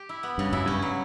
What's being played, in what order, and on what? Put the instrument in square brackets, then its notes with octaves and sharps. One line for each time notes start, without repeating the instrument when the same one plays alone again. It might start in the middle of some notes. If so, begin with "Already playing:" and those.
Already playing: [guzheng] G4
E4
B3
[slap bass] G2 [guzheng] C#3
[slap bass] F#2 [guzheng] E4
[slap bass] G2 [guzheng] C#4
[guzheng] F#3